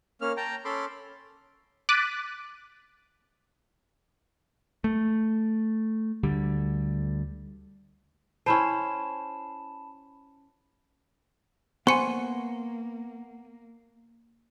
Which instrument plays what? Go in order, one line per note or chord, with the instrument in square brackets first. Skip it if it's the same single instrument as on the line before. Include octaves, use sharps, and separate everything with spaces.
[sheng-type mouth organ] A#3 C#4 F6
G5 A5 A#5
C#4 A4 B5 C6 D6
[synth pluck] D6 F#6 A6 B6 D7 D#7
[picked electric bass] A3
D2 D3 G3
[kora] C#4 E4 C5 [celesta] A5 B5 E7
[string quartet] A#3 [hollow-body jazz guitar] B3 G#5 [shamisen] C5 [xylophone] C#6 C#7